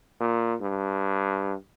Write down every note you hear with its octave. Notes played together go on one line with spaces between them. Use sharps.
A#2
G2